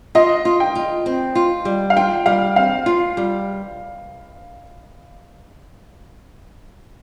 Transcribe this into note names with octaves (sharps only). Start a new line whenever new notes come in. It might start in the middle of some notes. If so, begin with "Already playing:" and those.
F4 D#5
F4
G5
F4
C4
F4
G3
F5
F4 G5
G3 F5
C4 F5
F4
G3